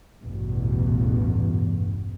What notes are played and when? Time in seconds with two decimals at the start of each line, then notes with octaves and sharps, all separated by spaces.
0.22 A1 E2 G2 B2